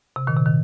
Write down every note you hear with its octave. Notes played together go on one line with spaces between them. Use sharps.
C3
A#2 D#3
C3
D#3